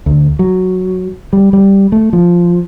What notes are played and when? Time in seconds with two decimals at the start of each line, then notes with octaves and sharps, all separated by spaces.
0.06 D2
0.39 F#3
1.33 G3
1.53 G3
1.92 A3
2.13 F3